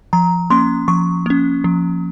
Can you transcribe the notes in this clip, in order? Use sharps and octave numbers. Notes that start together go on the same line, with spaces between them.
F3 A#5
A#3 C#4 C6
F3 C#6
A#3 C#4
F3